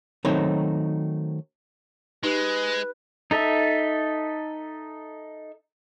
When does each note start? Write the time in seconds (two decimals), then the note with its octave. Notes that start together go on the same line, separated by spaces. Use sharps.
0.25 D#3 F#3 A3 C4 D#4 C#5
2.23 G#3 D#4 G4 B4
3.31 D#4 A4 E5